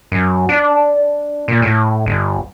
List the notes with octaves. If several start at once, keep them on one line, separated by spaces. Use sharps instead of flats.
F#2
D4
A#2
A2
G1